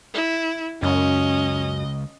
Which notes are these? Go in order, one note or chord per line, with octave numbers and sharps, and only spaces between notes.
E4
C#2 F#2 C#4 D#5